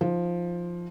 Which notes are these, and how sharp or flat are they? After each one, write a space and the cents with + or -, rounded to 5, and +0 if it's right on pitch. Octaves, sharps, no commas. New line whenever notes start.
F3 +0 D#4 +20